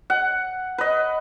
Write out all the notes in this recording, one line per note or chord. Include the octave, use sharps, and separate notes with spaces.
F#5
B4 D#5